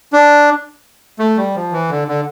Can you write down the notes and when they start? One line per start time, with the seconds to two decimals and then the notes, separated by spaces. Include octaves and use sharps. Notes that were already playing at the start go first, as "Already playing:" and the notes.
0.13 D4
1.19 A3
1.37 G3
1.55 F3
1.72 E3
1.90 D3
2.08 D3